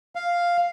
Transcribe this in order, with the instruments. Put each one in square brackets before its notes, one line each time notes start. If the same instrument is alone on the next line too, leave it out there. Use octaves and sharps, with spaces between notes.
[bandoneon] F5